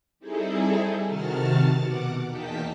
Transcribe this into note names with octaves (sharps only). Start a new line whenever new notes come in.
G3 C4 D#4 E4 G#4 A4
C3 D#3 F#4 A5 F6 A6
B2 F#5 D6
E2 A#3 D#4 G5 A5 B6